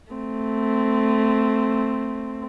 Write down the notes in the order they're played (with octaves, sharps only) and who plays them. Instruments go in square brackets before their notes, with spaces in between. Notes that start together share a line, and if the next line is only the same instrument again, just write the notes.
[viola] A3 C4